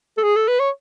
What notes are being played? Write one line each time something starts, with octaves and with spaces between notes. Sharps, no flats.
A4
G#4
A4
B4
C#5